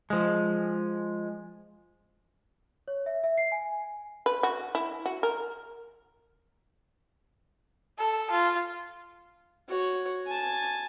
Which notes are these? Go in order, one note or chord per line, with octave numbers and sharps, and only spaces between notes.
F3 G#3
C#5
E5
E5
C7
G#5
B4
F#4
E4
F#4
A#4
A4
F4
F#4 C#5
G#5 A5